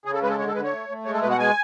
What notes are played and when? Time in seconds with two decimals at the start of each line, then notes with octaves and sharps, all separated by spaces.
0.05 C#3 G#4
0.14 A4
0.22 G#3 B4
0.30 A4
0.39 D3 C#5
0.47 A4
0.55 D3 B4
0.64 C#5
0.72 A3
0.89 A3
1.05 G#3 C#5
1.14 A4
1.22 B2 B4
1.31 F#5
1.39 G#3 G#5